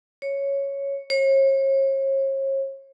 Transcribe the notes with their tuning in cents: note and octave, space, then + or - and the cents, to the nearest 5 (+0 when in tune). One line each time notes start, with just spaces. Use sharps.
C#5 +0
C#5 -40